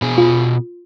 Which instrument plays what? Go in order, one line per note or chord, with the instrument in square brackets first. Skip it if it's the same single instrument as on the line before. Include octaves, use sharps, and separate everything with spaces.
[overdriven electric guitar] B2 G#4
[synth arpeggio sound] F4